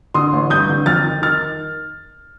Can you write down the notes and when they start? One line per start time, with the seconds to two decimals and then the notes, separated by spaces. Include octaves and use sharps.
0.14 D3 C6 D#6
0.33 A1
0.50 G2 D#6 G6
0.69 D3
0.86 F2 F6 A6
1.05 D#3
1.22 D#3 F6 A6